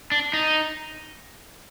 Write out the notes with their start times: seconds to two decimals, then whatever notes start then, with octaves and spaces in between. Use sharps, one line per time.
0.12 D4
0.33 D#4